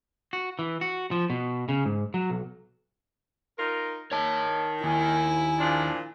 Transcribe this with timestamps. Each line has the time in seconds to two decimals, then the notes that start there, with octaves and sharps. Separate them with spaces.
0.33 F#4
0.59 E3
0.81 F#4
1.11 F3
1.30 B2
1.69 C#3
1.86 G#2
2.14 F#3
2.30 B1
3.58 D#4 F4 A#4
4.12 D#3 C#5 A5
4.84 D#2 E4 G#5
5.59 A#2 F3 D4